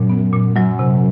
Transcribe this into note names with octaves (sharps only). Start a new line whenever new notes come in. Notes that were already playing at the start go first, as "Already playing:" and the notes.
Already playing: F#2 A#2
B3
A#2
F#2 F#3
C3